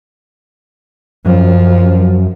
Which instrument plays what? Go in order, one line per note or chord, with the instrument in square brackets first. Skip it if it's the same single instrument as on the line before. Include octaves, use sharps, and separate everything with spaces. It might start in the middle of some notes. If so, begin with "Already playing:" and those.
[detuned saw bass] F#2 [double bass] F3